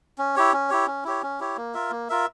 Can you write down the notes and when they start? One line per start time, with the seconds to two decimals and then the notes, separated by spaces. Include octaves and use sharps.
0.18 C#4
0.36 E4 G4 C#5
0.53 C#4
0.69 E4 G4 C#5
0.87 C#4
1.04 E4 G4 C#5
1.23 C#4
1.40 E4 G4 C#5
1.57 A#3
1.74 F4 A#4 E5
1.91 A#3
2.09 F4 A#4 E5